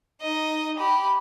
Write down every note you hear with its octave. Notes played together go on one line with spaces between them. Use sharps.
D#4 D#5
G4 B5